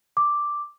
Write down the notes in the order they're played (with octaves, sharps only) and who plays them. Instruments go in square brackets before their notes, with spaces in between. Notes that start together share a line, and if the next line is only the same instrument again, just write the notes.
[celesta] D6